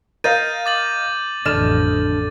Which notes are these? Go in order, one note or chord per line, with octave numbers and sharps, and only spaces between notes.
A#4 D#5 F5 G6 A6 D#7
D6 A6 F#7
A1 F2 D3 D#5 F6 A6 E7